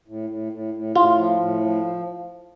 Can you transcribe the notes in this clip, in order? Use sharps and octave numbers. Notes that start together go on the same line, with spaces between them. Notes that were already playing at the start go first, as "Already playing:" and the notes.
A2
A2
A2
A2
A2 F4
F3
A2
F3